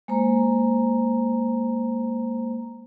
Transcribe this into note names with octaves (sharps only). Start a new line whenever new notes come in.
G#3 A#3 C5 A#5